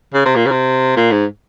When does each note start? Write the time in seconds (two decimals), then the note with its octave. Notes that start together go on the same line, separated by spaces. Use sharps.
0.14 C#3
0.25 C3
0.35 A#2
0.46 C#3
0.51 C3
0.96 A#2
1.11 G#2